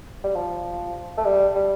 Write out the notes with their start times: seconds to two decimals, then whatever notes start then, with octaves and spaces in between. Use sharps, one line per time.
0.24 G3
0.35 F3
1.17 A3
1.25 G3
1.55 G3